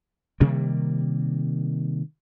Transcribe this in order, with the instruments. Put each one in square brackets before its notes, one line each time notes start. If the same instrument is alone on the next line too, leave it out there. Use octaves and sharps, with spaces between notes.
[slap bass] C3 D#3 G3 A#3